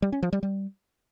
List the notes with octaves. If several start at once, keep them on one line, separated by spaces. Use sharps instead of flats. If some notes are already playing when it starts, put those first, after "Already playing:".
G3
C#4
F3
G3
G3